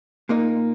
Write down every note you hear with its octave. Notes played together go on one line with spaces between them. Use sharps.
A#2 A#3 D#4